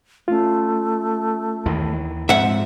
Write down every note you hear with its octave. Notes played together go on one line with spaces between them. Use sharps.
A3 C#4 F4
D#2 D#3 E3
G#2 F3 G#3 C4 E5 F#5